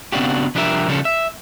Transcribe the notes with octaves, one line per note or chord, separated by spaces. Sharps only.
C#3 B3 C4 D4 F#4 G4
C2 F3 D4 G4 A#4 E5
C#3 F3 G3 C#4 G#4 A4
E5